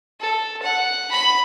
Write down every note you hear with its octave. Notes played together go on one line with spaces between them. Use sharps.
A4
F#5
B5